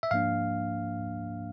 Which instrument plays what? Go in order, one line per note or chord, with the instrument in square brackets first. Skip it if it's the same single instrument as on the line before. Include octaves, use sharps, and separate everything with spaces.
[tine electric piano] E5
G#2 F3 A#3 D4 F5